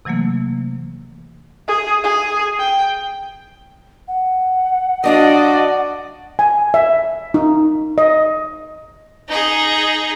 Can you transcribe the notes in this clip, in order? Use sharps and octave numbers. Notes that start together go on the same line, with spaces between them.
C3 E3 F#3 A3 A#3
G#4
G#4
G5
F#5
F#3 D4 F4 F#4 D5 D#5
G#5
E5
D#4
D#5
D#4 G#4